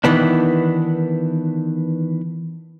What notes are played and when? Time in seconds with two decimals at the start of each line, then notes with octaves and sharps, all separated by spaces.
0.04 D#3 E3 B3 D4